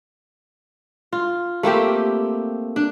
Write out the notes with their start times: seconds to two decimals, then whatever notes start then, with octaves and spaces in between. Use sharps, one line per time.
1.13 F4
1.63 A3 A#3 C4 G4
2.76 D4